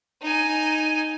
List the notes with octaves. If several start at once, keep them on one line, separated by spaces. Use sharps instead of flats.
D#4 G#5